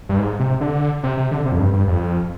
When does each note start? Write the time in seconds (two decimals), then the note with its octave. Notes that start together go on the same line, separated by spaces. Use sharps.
0.09 G2
0.19 G#2
0.39 C3
0.61 D3
1.04 C3
1.18 C3
1.31 D3
1.46 C3
1.52 F2
1.59 G2
1.73 G2
1.87 F2